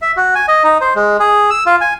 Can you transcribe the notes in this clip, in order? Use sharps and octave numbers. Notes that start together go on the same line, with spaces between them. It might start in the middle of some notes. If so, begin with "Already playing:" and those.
E5
F#4
G#5
D#5
D#4
C5
G#3
G#4
E6
F4
G#5